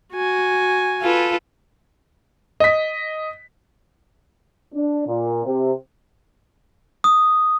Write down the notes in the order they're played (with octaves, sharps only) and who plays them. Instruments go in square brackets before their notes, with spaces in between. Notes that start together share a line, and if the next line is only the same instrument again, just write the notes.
[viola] F#4 G#5
[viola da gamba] F4 A4 B4
[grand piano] D#5 B6
[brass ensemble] D4
A#2
C3
[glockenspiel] D#6